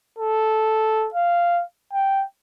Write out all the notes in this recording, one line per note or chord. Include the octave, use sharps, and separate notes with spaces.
A4
F5
G5